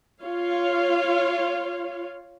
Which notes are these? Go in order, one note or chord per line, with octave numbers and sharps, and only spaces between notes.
F4 C#5 F5